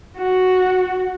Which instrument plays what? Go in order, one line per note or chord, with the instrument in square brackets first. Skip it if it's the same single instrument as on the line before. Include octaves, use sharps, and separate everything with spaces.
[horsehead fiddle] F#4